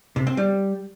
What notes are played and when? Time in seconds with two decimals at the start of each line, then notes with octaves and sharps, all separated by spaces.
0.16 C3
0.27 C4
0.37 G3